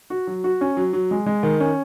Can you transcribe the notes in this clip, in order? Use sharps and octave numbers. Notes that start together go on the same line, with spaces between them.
F#4
F#3
F#4
C#4
F#3
F#3
G#3
G#3
D#3
C#4